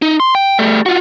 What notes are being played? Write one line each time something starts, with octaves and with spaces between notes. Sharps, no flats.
D#4
C6
G5
G3 A3
F4 F#4